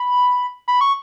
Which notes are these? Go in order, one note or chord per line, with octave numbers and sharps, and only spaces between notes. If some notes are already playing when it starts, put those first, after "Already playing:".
Already playing: B5
B5
C#6